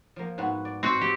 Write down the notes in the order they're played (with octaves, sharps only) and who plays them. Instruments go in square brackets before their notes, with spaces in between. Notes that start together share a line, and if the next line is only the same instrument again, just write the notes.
[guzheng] F3 A#3
G#2 B3 F#4
D5
[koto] C4 F#4
G4